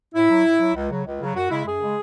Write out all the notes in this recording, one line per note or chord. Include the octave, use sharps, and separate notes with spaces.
A2 E4
F#3
A2
F#3
C#2
C#3 F#3
C#2
C#3 F#3
F#2 F#4
C#3 G#3 E4
F#2 G#4
C#3 G#3